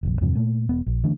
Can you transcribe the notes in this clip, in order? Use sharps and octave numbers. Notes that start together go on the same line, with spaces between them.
F1 A#1
E2 G2 C3 F3
A#2 A3
E1 B3
A#1
D3 E3 A3 D4